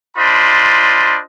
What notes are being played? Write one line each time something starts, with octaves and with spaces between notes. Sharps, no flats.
D4 F4 C5 D#5 B5